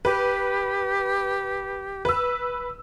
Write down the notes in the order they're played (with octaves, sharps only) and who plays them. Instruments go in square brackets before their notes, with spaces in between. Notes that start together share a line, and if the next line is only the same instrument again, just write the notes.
[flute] G4 [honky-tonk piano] B4
[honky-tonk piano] B4 E6